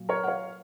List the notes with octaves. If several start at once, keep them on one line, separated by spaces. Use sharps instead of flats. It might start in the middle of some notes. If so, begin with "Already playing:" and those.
Already playing: A#2 F#3
A#4 C#5
F#5
C#5 F5